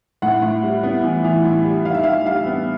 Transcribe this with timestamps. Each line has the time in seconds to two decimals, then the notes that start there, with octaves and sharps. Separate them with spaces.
0.22 A2 F#5
0.42 A2
0.63 G3
0.83 B3
1.04 E3
1.24 E3
1.45 A2
1.65 G3
1.85 D#3 F5
1.94 E5
2.03 G3 F5
2.26 G3 F5
2.46 B3